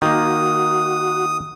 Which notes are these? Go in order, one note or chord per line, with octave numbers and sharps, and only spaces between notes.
D#3 A#3 F#4 D#6